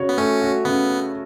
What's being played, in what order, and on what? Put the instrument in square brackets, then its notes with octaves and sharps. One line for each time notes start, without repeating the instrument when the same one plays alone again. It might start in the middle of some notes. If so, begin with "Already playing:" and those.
Already playing: [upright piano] C#3 F#4 C#5
[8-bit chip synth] B3
[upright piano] A3 [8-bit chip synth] C#4
[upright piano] F#4
[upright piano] C#3 [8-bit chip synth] B3